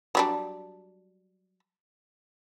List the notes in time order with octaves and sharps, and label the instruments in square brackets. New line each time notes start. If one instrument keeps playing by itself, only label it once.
[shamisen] F#3 G3 D4